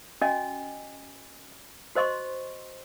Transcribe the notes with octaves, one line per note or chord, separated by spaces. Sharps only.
C#4 F#4 D#5 G#5
F#4 C5 D#5 C6 C#6